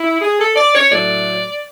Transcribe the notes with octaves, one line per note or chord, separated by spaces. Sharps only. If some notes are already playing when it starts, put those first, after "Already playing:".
Already playing: E4
G#4
A4
D5
C#5
A2 F#3 A3 D5